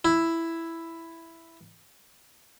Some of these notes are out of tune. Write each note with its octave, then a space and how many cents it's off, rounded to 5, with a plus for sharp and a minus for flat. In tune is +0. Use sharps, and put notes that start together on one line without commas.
E4 +5